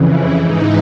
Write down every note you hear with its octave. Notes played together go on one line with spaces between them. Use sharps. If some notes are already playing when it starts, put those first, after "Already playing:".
Already playing: F2 C#3 E3
E4
G#2 E3 D#4